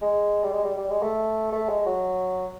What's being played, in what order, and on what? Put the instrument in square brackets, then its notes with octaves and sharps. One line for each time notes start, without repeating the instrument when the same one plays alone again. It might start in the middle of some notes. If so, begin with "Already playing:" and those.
[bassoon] G#3
G3
G#3
G3
G3
G#3
A3
A3
G#3
F#3